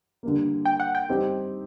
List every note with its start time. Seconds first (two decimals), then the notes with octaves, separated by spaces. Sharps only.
0.23 D3 G3 A#3
0.65 G5
0.80 F#5
0.95 G5
1.09 G3 C4 D#4 G4